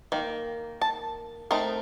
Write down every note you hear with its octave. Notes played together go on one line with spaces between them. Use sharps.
D#3 A#3
A5
A3 C4 D#4 A#4